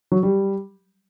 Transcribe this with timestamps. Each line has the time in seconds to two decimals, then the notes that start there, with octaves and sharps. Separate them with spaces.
0.12 F#3
0.23 G3